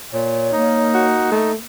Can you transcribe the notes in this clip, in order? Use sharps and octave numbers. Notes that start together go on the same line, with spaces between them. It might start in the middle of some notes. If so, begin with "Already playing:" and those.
A#2 C#5
A#3 D#4
F#4
A3